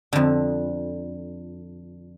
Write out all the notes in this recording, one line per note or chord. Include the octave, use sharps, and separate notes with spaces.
F2 D3